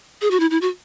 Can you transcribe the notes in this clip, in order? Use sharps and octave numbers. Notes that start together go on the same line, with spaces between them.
G#4
F#4
E4
E4
F#4